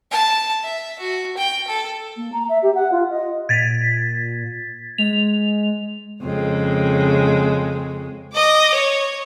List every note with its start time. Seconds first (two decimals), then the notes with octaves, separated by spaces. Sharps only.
0.11 A5
0.63 E5
0.99 F#4
1.37 G5
1.68 A4
2.16 A#3
2.32 A#5
2.49 E5
2.62 G4
2.74 F#5
2.91 F4
3.10 D#5
3.49 A#2 G#6 A6 B6
4.98 G#3 F7
6.22 F2 C#3 G#3
8.33 D#5 D6
8.74 C#5